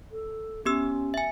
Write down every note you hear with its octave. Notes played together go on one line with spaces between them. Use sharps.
A4
B3 C#4 G4 E6
E5 G#5